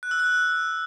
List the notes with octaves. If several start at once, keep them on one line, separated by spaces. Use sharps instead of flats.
F#6
E6
F#6